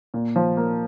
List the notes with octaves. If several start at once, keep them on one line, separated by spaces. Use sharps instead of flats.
A#2
F3
A#3